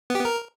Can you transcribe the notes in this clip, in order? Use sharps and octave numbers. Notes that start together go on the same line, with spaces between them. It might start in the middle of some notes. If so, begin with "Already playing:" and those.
B3
G4
B3
A#4